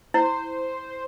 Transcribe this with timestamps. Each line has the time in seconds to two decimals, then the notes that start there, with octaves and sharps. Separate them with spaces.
0.14 E4 C5